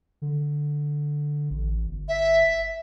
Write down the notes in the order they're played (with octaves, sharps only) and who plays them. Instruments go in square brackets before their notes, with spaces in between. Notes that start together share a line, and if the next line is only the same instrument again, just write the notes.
[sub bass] D3
A1
G1
[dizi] E5